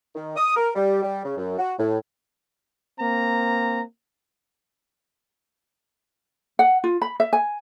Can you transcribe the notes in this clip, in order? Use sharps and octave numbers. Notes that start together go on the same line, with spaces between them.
D#3
D#6
A#4
G3
G3
C#3
F#2
F#4
A2
A#3 C4 A#5
F#5
F4
B5
E5
G#5